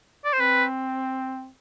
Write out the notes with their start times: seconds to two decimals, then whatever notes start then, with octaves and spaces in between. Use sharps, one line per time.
0.25 D5
0.33 C5
0.40 C4 B4